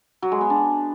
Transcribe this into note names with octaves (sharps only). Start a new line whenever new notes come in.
F#3
G#3
B3
D4